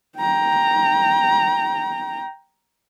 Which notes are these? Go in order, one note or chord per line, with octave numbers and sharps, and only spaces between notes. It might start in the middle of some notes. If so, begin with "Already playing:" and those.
G5 A#5